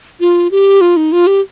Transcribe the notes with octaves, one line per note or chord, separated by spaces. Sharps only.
F4
G4
F4
D#4
F4
G4